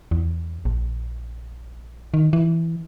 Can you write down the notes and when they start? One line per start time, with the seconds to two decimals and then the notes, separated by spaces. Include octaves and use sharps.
0.11 E2
0.65 A#1
2.14 D#3
2.33 E3